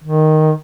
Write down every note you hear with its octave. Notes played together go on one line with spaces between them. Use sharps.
D#3